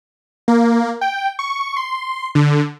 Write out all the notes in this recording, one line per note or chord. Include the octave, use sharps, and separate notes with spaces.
A#3
G5
C#6
C6
D3